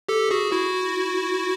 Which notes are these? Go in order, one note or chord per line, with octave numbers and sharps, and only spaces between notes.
G4 A4
F#4 G#4
E4 F#4